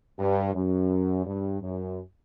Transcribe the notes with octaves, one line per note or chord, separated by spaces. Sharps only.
G2
F#2
G2
F#2